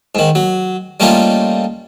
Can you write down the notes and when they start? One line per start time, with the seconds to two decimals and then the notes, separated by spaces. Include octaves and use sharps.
0.15 G#2 D#3
0.35 F#3
1.00 G3 A3 A#3 C#4 D#4 F4